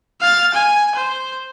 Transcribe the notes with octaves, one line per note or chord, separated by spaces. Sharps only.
F5 A6
G#5
C5